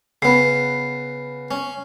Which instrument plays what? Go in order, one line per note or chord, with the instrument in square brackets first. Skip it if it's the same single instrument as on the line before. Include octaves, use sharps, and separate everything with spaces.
[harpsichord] C#3 B3 [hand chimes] C7
[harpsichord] C#4